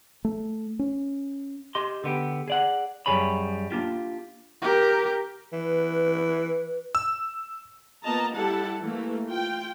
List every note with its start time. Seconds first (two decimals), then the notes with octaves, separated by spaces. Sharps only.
0.25 A3
0.79 C#4
1.75 G4 D#5 C6
2.04 D3 B3 G4
2.48 G#4 D5 F#5
3.06 F#2 G3 G#4 C#5 B5
3.71 A#3 D4 F4 G4
4.62 G4 A#4
5.52 E3 B4
6.95 E6
8.03 A#3 B3 F4 D#5 A5 A#5
8.34 G3 E4 G4 A4 F#5 A5
8.82 E3 A3 A#3
9.27 F4 G5